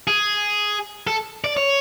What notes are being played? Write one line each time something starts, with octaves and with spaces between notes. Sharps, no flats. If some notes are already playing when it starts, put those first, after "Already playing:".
G#4
A4
D5
C#5